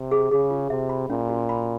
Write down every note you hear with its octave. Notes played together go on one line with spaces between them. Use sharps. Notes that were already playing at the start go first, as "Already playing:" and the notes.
Already playing: C3
G#4
C#3 G#4
F4
C3 E5
B5
A#2 C#4
F#4
B5